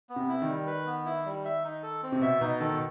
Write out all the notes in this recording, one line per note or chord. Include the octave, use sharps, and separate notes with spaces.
B3
C3
E4
D#3
G3
B4
B3
E4
G3
E5
D#4
A4
C4
C3
B2 E5
B2 D#4
D#3 A4
B2